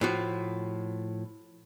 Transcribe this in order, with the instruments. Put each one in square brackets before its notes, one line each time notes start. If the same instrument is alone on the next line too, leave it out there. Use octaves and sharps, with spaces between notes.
[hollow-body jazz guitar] A2 F3 F#4